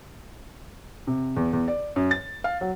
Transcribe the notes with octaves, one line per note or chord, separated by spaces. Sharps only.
C3
E2
E2
D5
F#2
A6
F5
F#3